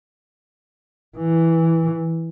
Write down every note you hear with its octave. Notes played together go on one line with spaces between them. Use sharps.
E3